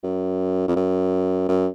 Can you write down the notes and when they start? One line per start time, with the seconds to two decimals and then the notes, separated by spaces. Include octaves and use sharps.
0.04 F#2
0.68 F2
0.76 F#2
1.49 F#2